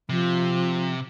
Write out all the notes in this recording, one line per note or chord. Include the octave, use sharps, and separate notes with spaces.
C3 F3